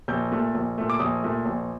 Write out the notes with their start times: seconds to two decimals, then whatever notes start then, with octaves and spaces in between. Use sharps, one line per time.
0.08 A#1 G6
0.32 A#2 A3
0.54 A#1
0.78 A#2 A3
0.90 D6
0.99 A#1 D#6
1.23 A#2 A3
1.45 A#1